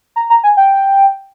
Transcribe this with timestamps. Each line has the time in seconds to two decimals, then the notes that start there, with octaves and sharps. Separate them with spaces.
0.16 A#5
0.30 A#5
0.44 G#5
0.57 G5